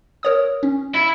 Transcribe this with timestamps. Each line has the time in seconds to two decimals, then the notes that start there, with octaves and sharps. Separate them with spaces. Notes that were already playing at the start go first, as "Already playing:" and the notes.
0.23 A#4 C#5 D#6
0.63 C#4
0.94 E4